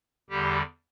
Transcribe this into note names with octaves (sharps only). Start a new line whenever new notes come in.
E2 D3 G3 G4